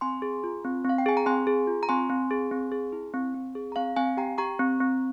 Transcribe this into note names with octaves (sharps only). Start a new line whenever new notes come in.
C4 G#5 C6
G#4
F4
C4
C4 F5
G5
G#4 G#5
A#5
C4 G#5 C6
G#4
F4
A#5
C4 G#5 C6
C4
G#4
C4
G#4
E4
C4
C4
G#4
A#5
C4 F5 G#5
C4 F5 G#5
G4 G5 A#5
G4 A#5 C#6
C4
C4